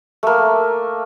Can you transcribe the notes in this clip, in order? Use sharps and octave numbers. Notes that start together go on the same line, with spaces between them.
A3 A#3